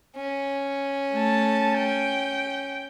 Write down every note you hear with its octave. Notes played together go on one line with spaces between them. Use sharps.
C#4
A3 A5
G5